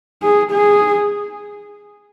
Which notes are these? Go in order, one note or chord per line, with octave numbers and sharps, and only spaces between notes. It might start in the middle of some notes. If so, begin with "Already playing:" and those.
G#4
G#4